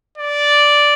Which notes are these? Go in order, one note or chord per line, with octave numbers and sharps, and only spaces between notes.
D5